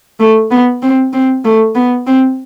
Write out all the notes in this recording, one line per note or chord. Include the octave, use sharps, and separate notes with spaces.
A3
B3
C4
C4
A3
B3
C4